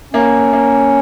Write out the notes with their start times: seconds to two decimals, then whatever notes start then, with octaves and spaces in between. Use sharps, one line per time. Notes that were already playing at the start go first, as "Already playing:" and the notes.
0.13 A#3 C#4
0.53 A#3